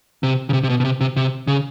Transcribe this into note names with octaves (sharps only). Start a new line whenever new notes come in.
C3
C#3
C3
C3
B2
B2
C3
C3
C3
C#3